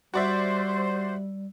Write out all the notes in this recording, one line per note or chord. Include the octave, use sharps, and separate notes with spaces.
G3 F#4 C5 D5 E5